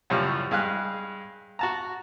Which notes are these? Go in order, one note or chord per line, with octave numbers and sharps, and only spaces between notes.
F#2 A2 C#3 F3 G3
G2 G#3 F5 G#5 F#6
F#4 A5 A#5